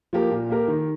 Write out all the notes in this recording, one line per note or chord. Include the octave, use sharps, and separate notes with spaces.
F3 A#3 G4 A#4
A#2
A#3 G4 A#4
D#3